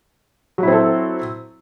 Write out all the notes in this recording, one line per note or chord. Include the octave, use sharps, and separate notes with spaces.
F#3 C4 E4 A4